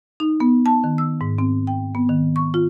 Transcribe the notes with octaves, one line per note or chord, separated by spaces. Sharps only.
D#4
B3
A5
D#3
E6
G#2
C4
G5
B3
D#3
C#6
F4